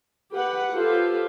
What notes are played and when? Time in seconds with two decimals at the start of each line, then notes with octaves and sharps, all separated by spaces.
0.33 G4 B4 F#5
0.74 F4 G4 A4 B4 C5